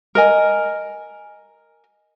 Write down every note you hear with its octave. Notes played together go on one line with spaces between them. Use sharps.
A#4 D#5 G#5